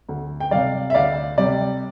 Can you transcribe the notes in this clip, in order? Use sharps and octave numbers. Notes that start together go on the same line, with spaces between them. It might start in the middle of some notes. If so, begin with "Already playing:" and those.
D2
G5
C3 G3 D5 F5
E5
D2 D5 F5
C3 G3 D5